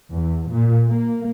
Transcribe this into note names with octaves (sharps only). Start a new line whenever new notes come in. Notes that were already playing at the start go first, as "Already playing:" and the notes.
E2
A#2
A#3